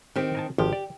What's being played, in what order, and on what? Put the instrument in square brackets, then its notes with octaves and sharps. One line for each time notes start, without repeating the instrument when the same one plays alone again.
[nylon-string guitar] D#3 C4 [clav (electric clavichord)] G4 G5
[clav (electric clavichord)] A#4 G#5 A5
[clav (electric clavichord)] G#1 F3 [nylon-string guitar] G4
[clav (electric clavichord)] D5